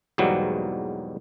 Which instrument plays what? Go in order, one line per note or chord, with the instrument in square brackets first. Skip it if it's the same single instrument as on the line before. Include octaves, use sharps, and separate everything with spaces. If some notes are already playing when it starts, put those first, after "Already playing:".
[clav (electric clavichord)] E2 G#2 B2 F#3 G3 A#3